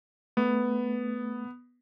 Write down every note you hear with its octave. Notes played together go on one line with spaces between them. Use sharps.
A3 B3